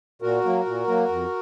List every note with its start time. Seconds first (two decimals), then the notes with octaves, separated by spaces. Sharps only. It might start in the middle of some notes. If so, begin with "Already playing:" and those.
0.22 A#2 F#4 A#4
0.44 F#3 A#3
0.66 A#2
0.87 F#3 A#3
1.08 F2